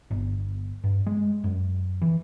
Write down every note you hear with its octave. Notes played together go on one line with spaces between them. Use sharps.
G1
G2
G#3
F#2
E3